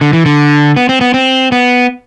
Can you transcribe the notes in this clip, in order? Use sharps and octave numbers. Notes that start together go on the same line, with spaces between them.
D3
E3
D3
B3
C4
B3
C4
B3